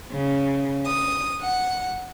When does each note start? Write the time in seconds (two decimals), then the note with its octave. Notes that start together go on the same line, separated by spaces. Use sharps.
0.12 C#3
0.85 D#6
1.41 F#5